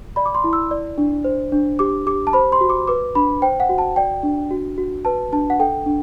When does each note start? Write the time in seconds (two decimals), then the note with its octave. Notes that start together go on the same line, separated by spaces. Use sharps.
0.16 D5 B5
0.26 D6
0.35 C6
0.44 E4
0.53 E6
0.71 D5
0.98 D4
1.24 C5
1.52 D4
1.79 G4 D6
2.06 G4 D6
2.27 A5
2.33 C5 B5
2.52 C6
2.61 F#4
2.70 D6
2.88 B4 D6
3.15 D4 B5
3.42 C5 G5
3.60 F#5
3.69 F#4
3.78 A5
3.96 D5 G5
4.23 D4
4.51 F#4
4.78 F#4
5.05 B4 A5
5.33 D4 A5
5.50 F#5
5.59 A4 G5
5.86 D4